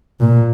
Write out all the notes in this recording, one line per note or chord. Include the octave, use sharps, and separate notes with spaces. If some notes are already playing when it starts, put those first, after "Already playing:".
A#2